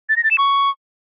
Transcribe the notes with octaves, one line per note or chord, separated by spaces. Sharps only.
A6
A#6
A6
E7
C#6